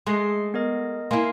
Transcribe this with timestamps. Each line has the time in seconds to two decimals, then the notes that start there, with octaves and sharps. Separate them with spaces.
0.07 G#3 A3 G#4 C6 C7
0.54 B3 A#4 D#5
1.11 A#3 E4 F5 G#5 C6